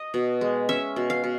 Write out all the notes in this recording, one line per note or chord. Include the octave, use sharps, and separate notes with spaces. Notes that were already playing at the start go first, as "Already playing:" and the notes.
Already playing: D#5
B2
G#3
C#4 E5
B2
F5
B2